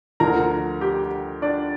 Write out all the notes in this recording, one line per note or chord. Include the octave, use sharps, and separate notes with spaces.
D2 D3 F3 A#4 A#5
G4 G5
D4 D5